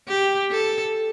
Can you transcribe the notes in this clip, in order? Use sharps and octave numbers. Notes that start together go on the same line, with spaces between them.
G4
A4